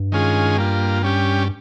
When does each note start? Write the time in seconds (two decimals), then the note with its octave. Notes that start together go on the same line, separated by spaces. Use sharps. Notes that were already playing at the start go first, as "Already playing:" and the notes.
Already playing: G2
0.12 D#3 G#3 C#4 F4 G#4
0.57 G3 A#3 F4
1.03 G3 C#4 G4